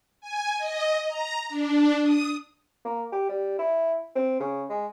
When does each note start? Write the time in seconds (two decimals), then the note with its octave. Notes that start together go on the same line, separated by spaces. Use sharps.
0.21 G#5
0.57 D#5
1.07 A#5
1.49 D4
2.03 D#6
2.85 A#3
3.12 G4
3.29 G3
3.59 E4
4.15 C4
4.40 C#3
4.69 G#3